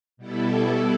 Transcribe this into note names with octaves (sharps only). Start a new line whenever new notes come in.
B2 G3 B3 E4 A4